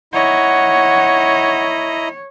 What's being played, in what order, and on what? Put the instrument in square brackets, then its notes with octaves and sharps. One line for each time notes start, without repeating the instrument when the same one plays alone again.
[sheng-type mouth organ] E4 D#5 A#5 [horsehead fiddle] C#5 [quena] F#5